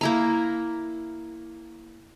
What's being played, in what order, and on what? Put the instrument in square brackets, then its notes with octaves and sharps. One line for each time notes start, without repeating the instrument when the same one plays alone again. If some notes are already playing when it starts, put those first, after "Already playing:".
[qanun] A#3 E4 A#5